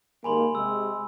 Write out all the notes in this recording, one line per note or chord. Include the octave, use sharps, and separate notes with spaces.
D#2 G#2 A#3 G#5 B5 C6
C3 G#3 E6